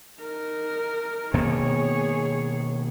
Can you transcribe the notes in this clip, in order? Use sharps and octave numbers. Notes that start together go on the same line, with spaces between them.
D#4 A#4
B2 D#3 A#3 G#4 C#5